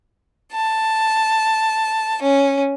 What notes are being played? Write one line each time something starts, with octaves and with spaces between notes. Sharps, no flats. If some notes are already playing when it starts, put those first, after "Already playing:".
A5
C#4